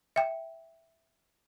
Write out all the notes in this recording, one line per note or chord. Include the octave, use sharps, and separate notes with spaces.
E5 G5